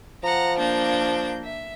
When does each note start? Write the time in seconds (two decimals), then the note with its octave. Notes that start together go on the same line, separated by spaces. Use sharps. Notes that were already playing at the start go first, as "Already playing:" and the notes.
0.23 F3 F#5 A#5
0.58 A#3 D4 G6
1.43 E5